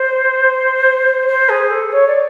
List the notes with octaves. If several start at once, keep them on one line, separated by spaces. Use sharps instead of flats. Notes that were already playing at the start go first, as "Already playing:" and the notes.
Already playing: C5
C5
G#4
A4
C#5
D5